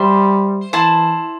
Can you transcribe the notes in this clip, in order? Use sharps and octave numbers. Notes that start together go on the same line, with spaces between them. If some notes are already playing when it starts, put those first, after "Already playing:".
Already playing: G3 C5 E5 C6
E3 E4 C5 A5